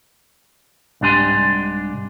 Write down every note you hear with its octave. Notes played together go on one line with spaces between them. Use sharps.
C2 G#2 D4 G4 G#5 C6